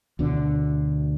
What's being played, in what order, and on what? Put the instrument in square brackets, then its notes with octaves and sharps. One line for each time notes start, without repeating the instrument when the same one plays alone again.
[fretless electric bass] D2 B2 D3